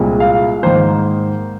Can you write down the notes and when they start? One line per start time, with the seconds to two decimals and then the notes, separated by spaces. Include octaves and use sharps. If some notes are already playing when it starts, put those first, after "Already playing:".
Already playing: C2 A#2 G#3 C4
0.20 F5
0.63 G#2 D#3 A#3 C5